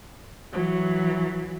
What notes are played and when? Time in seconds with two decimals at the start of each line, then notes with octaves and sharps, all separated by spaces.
0.51 E3 F#3